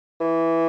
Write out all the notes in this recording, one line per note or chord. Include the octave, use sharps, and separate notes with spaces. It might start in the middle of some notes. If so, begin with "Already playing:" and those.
E3